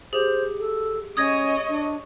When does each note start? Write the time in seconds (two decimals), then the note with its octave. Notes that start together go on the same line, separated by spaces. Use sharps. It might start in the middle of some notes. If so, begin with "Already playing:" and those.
0.13 G4 G#4 C5
0.59 A4
1.17 C#4 C#5 D#5 D#6 G#6 A#6
1.69 D4